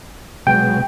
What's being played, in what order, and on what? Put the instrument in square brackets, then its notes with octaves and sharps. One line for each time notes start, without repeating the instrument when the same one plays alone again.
[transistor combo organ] B2 F#3 G#3 [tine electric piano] G5